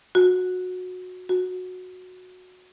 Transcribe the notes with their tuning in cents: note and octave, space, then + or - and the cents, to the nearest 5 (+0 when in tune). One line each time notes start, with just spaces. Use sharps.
F#4 -20
F#4 -15